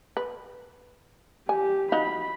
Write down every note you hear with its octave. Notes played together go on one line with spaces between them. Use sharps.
B4
G4 G#5
D#4 F4 F#4 B5